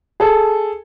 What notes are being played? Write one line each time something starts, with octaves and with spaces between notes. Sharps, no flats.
G#4 A4